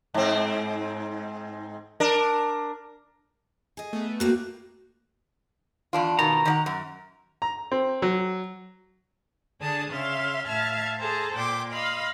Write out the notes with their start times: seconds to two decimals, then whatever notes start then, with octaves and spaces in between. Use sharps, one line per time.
0.14 G#2 C4
2.00 D4 A#4
3.77 G#4 D#5
3.93 A3 B3
4.20 A2 A#3 C4 F#4
5.93 E2 D4 F4
6.19 B2 D#3 A#5
6.45 D#3 D5 F#5
6.66 F#2
7.42 A#5
7.72 C4
8.02 F#3
9.60 D3 D4 G#4 A5 D#6
9.89 C#3 E5 F5 C6
10.46 A2 E5 F5 A5 F6 G#6
10.99 G#4 A4 C5 A5 A#5
11.35 A#2 G5 C6 D6
11.71 D#5 F5 B5 C6